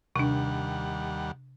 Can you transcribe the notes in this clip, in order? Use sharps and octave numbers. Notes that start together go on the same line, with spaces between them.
D#2 C3 G3 D4 F#5